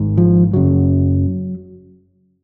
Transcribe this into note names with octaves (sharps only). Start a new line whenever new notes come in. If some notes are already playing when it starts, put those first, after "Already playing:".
Already playing: G#1 G#2
F3
F#1 F#2 C#3 F#3